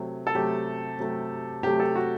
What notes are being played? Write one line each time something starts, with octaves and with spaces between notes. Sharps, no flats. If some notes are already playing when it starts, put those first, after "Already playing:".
Already playing: C3 F#3 A3
A4
C3 F#3 A3 G4
C3 F#3 A3
C3 F#3 A3 G4
A4
F#4